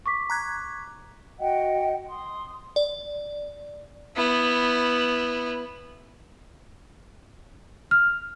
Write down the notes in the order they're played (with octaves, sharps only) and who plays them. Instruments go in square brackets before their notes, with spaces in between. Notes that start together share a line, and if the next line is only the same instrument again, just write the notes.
[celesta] C#6 D6 B6
[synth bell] A#5 F#6 G#6
[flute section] F#4 D#5 F#5 G5
C6 D#6
[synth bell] D5
[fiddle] B3 E4
[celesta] F6